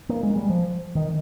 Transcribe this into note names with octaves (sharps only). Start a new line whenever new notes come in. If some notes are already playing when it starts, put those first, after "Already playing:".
A#3
G#3
G3
F3
D#3